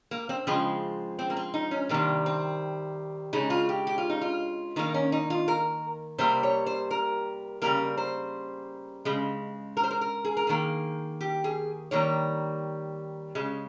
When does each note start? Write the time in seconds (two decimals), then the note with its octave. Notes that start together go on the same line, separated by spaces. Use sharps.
0.11 A#3
0.29 C4
0.47 C#3 F3 G#3 C4
1.19 C4
1.30 A#3
1.37 C4
1.54 D#4
1.71 C#4
1.89 C3 D#3 G3 A#3
2.26 C4
3.33 C#3 G#3 D#4
3.50 F4
3.69 G4
3.87 G4
3.98 F4
4.10 D#4
4.21 F4
4.76 D#3 A#3 D#4
4.94 C#4
5.12 D#4
5.30 F4
5.48 A#4
6.18 C3 G3 A#3 C5
6.43 C#5
6.66 C5
6.91 A#4
7.62 C#3 G3 A#3 A#4
7.97 C5
9.05 C#3 G#3
9.77 A#4
9.83 C5
9.91 A#4
10.01 A#4
10.25 G#4
10.37 A#4
10.47 D#3 A#3 G#4
11.21 G4
11.44 G#4
11.91 D#3 G3 A#3 C#5
13.35 C#3 G#3